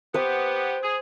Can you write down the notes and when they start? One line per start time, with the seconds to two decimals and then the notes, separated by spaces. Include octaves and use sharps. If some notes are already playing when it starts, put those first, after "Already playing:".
0.14 B3 G4 C5
0.83 G#4